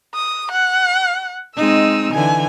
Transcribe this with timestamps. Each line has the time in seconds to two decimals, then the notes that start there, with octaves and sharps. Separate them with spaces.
0.15 D#6
0.51 F#5
1.57 G#3 C4 D#4 E6
2.14 D3 E3 G#5